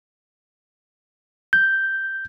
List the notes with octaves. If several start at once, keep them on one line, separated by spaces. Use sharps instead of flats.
G6